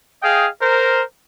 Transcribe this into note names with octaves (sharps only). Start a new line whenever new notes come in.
G#4 D#5 F5 G5
A#4 C5